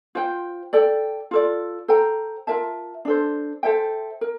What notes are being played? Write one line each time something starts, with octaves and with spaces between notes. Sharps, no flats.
F4 C5 G5
A4 D5 G5
F4 A4 D5
A4 C5 G5 A#5
F4 A#4 E5 A5
D4 A4 C5
A4 C5 E5 G5
A#4